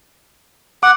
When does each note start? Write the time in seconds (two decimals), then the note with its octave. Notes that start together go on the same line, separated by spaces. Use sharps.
0.83 F#5 D6